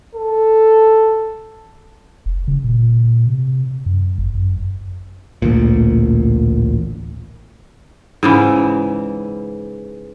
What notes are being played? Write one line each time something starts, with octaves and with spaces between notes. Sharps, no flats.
A4
F1
C#3
A#2
C3
F#2
G1
F#2
A1 D2 A#2
G#2 C#3 E3